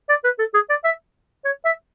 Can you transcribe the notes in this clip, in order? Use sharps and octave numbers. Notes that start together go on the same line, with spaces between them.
D5
B4
A4
G#4
D5
E5
C#5
E5